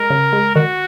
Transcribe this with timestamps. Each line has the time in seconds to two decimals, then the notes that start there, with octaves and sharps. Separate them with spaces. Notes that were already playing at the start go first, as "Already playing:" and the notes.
Already playing: G#3 A#4
0.10 C#3
0.33 G#3
0.55 D#3 F#4